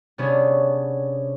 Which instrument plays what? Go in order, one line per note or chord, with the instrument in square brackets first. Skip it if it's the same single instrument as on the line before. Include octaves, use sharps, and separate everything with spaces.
[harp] C3 B3 C#4 D4 G#4